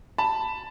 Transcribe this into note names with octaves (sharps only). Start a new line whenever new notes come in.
A5 B5